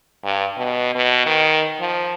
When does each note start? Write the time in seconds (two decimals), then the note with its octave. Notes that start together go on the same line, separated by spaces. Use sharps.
0.24 G2
0.58 B2
0.95 B2
1.26 D#3
1.81 F3